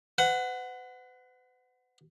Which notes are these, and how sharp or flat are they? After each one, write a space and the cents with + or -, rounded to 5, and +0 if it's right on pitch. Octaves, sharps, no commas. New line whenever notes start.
B4 +45 F#5 +0